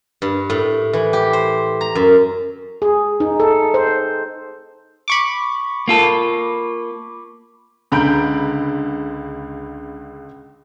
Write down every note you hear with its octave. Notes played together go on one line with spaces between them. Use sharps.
G2
A2
E3
G4
C5
A#5
F#2
G#4
D#4
A4
C5
B5 C#6 D6
A#3 F4 A4
C#2 D3 A#5 B5 G6 D7